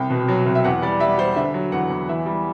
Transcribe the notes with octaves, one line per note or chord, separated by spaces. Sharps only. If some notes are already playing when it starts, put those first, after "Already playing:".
Already playing: C2 G5
B2
F#3
C2
E5
E2 F#5
G3 D5
G3 E5
G3 C5
D3 E5
F#3
E2 F#5
E2
E3 E5
G3